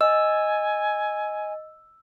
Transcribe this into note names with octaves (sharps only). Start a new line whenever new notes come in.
D#5 G#5 E6